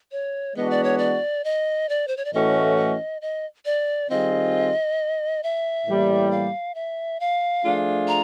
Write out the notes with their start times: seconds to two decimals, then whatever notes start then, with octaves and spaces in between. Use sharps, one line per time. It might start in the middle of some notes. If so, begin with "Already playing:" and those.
0.12 C#5
0.56 E3 G#3 B3 D4 F#4 D#5
0.70 D5
0.84 C#5
0.98 D5
1.44 D#5
1.89 D5
2.08 C5
2.17 C#5
2.25 D5
2.33 A2 E3 A3 C#4 F#4 D#5
2.77 D#5
3.22 D#5
3.65 D5
4.10 D#3 G3 C4 F4 G#4 D#5
5.43 E5
5.86 A2 E3 G3 A#3
6.31 F5
6.75 E5
7.20 F5
7.63 F3 A3 D4 F4 G#4
8.08 A#5